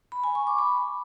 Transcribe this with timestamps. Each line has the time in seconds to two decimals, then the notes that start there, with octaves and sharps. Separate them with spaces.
0.12 B5
0.24 G#5
0.35 C#6
0.47 D6
0.59 B5